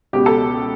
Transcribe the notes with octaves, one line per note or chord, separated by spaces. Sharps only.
C#2 B2 G4
A4